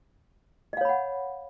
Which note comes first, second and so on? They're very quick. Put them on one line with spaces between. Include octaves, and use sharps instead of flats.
D#5 F5 C#5 B5 F#5